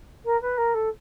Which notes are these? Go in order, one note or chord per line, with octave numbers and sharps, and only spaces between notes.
A#4
B4
A#4
A4